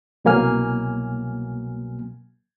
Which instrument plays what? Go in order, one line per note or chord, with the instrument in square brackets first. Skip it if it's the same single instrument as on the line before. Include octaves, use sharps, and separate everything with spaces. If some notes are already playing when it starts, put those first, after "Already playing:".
[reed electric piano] C2 B2 F#3 A#3 G#5 F6